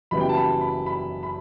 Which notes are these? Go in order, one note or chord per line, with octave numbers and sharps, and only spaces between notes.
F#1 F#2 E3 G3 B3 B5
G5
A5
B5
B5
B5
B5